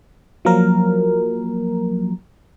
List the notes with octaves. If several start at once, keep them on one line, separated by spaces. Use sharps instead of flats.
F3 F#3 A#3 A#4